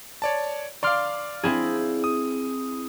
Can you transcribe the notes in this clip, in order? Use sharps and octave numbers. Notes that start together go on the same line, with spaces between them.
C#5 D5 A5
D5 F5 C6 D6 F6
C4 E4 G#4
D#6